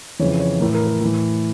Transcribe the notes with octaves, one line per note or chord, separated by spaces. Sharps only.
F2 C#3 E3 C#5
C#5
A2 E3 A#4
A#4
A#4
A2 E3